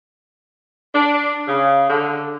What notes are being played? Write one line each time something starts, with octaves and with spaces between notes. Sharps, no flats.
D4
C#3
D3